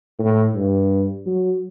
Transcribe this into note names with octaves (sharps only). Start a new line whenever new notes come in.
A2
G2
F#3